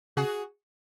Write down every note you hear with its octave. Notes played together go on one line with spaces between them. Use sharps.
C#3 F#4 G#4